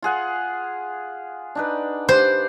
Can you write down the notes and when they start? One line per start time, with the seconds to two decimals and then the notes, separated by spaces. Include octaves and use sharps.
0.02 F4 G#4 F#5
1.55 D4 D#4 B4
2.09 G4 B4 C5